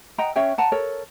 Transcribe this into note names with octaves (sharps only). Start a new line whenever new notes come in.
D#5 F#5 G5 A#5
C#4 C#5 E5 G5
F#5 A5 A#5
A4 A#4 C#5